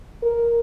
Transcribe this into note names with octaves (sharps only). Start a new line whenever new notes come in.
A#4